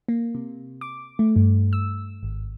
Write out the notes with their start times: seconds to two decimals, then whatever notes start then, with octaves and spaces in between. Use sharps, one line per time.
0.08 A#3
0.35 C3
0.81 D6
1.19 A3
1.36 G2
1.73 E6
2.23 G#1